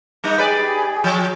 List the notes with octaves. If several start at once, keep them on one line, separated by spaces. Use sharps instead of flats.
G3 A#3 D#4
G4 G#4 B4 D5
F3